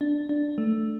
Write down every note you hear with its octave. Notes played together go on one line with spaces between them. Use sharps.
D4
D4
A3